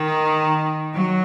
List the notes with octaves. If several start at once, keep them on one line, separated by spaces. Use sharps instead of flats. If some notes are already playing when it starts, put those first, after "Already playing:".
Already playing: D#3
F#3